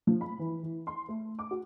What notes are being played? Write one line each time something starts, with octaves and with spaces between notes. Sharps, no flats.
F3
B5
E3
E3
C6
A3
D6
F#4